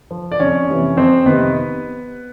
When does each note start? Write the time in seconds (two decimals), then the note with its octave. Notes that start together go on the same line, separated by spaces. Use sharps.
0.11 F3
0.32 D5
0.40 F2 C#4 C#5
0.69 C3 E3
0.97 F2 C4 C5
1.26 C3 D#3 B3 B4